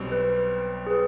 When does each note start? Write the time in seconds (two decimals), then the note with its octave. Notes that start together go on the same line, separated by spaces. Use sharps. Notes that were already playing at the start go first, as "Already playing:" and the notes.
Already playing: B1 B2 G3 C4
0.12 B4
0.87 G#4
0.90 B4